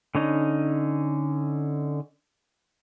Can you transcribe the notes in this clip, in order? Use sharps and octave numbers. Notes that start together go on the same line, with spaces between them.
D3 C#4 D#4